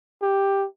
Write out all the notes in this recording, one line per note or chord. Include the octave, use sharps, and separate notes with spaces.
G4